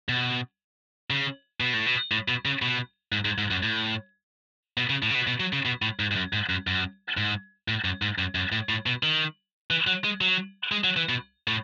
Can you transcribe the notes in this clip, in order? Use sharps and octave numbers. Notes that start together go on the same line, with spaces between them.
B2
C#3
B2
A2
B2
A2
B2
C#3
B2
G#2
G#2
G#2
F#2
A2
B2
C#3
A2
C#3
B2
B2
F#3
C#3
B2
A2
G#2
G#2
F#2
G#2
F#2
F#2
G#2
A2
F#2
G#2
F#2
F#2
A2
A2
B2
D#3
E3
F#3
G#3
F#3
G#3
F#3
E3
B2
A2